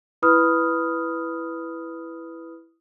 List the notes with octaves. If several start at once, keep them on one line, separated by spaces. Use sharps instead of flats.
E4 B4 B5 D#6 F6